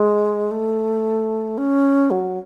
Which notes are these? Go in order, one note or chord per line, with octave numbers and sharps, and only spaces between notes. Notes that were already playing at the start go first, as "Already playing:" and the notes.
Already playing: G#3
A3
C#4
F#3